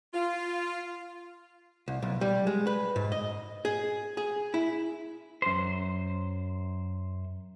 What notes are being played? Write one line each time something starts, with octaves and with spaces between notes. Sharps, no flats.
F4
C2
B1
G3
G#3
B4
G#2
D#5
G#4
G#4
E4
F#2 C5